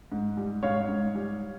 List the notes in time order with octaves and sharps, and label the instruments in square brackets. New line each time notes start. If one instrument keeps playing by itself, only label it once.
[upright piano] G#2
G3
G#2 C#5 F5
G#2
G3